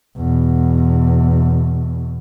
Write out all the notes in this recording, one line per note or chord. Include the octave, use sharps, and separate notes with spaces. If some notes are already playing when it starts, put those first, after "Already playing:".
E2 B2